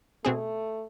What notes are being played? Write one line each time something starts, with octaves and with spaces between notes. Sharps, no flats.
B2 A3 C4 G#4